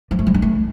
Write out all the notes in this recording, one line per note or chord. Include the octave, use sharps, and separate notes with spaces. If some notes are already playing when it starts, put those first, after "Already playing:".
F3
A3
G3
D#4
A3